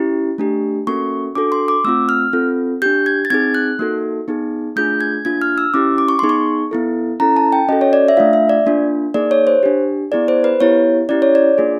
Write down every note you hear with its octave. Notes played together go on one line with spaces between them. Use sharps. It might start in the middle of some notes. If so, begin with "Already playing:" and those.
Already playing: C#4 E4 G4
A3 D4 G4
A#3 C#4 F#4 A4 C#6
D4 F#4 A4 D6
C6
D6
A3 C4 F4 E6
F6
C4 F4 A4
D4 G4 G6
G#6
A6
C4 D#4 G#4 G#6
F#6
A#3 D#4 F#4 A4
B3 D#4 G#4
A3 D4 F4 G#4 G6
G#6
A#3 D4 F4 G#6
F6
E6
C#4 E4 G4 D6
D6
C#6
B3 D#4 G#4 C6
C#6
B3 E4 A4
C#4 E4 A4 A#5
A5
G5
C#4 F#4 A4 D#5
C#5
D5
E5
A3 D4 F4 F5
E5
D5
A#3 D4 F4
A#3 D#4 G#4 D5
C#5
C5
D4 G4
B3 E4 G#4 D5
C5
B4
B3 E4 G4 C#5
C#4 E4 G4 D5
C#5
D5
A#3 D4 F4 G#4